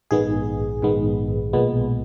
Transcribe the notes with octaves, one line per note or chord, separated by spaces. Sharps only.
A#1 G#2 D#3 G#3 B3 G#4
A#1 G#2 D#3 G#3 B3
B1 A#2 G#3 B3